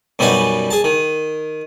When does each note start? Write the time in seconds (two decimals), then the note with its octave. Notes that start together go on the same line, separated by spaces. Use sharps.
0.19 F#2 B2 G3 D#4 F#4 G#5
0.71 G#4 A5
0.84 D#3